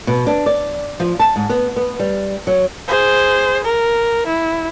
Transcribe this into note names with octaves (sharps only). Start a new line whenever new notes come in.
B2
D4
D5
F3
A5
G#2
B3
B3
G3
F#3
G#4 C5
A#4
E4